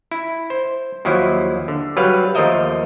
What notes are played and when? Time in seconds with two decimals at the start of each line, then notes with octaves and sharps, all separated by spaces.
0.12 E4
0.50 C5
1.05 D#2 F3 F#3 E4
1.68 D3
1.97 F#3 G3 B4 F5
2.35 D#2 F3 A3 A#4 D#5 E5